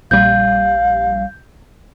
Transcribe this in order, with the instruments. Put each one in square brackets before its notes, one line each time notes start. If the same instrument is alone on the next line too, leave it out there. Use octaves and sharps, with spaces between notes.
[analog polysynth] A#1 G3 [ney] F5 [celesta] G6